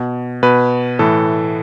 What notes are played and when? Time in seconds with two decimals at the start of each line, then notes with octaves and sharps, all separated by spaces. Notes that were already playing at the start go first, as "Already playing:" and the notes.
Already playing: B2
0.43 B2 B4
0.99 A2 E3 A4